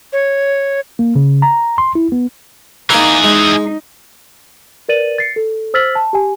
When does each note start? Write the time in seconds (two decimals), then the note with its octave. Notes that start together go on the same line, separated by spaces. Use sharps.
0.13 C#5
0.99 A#3
1.16 C#3
1.42 A#5
1.78 C6
1.95 E4
2.12 B3
2.90 E3 A#3 D#4 G#4 A#4
3.24 G#3 D#4
4.89 A#4 B4 D5 A6 D#7 F#7
5.18 A6 C7 C#7
5.36 A4
5.74 C5 E6 F6 A6 B6 F#7
5.95 A5
6.13 G4 G#5